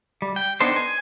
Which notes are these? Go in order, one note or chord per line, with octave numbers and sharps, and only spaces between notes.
G3
G5
B3 D4 D#4 A4 C5
G#5